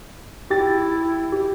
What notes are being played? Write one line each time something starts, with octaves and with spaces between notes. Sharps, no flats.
E4 G4 G5 A6
G4